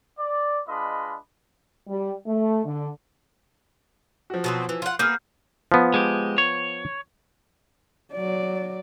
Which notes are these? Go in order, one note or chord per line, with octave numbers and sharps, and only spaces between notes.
D5
G#3 D4 F4 B4 D#5 B5
G3
A3
D3
F3 F#4
B2 F#3 C4
E3
F4 F#5
A#3 B3 G#4 F6 G6
F3 B3
G#3 G4
C#5
F#3 D5